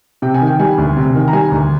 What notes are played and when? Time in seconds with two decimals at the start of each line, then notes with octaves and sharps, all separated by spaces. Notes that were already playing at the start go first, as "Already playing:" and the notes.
0.22 C3 G5
0.34 G#5
0.41 D#3
0.47 G5
0.60 G3 G#5
0.78 D2
0.97 C3
1.15 D#3
1.28 A#5
1.33 G3 G#5
1.52 D2